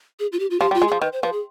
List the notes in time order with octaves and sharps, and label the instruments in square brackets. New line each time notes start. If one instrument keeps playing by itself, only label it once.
[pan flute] G#4
F4
G4
F4
[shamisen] F3 [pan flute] G4
[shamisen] G3
[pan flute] F4
[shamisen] G#3
[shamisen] F3 [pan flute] G#4
[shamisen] D#3 [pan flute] B4
[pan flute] C5
[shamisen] F3 [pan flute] B4
[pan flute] G#4